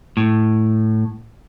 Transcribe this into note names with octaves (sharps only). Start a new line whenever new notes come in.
A2